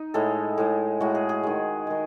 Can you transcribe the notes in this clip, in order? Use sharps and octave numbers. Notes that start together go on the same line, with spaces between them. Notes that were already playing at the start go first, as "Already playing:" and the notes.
Already playing: D#4
A2 G#3 A4
A2 G#3
A2 G#3 F#4
G#4
G#4
D#3 G#3
D#3 G#3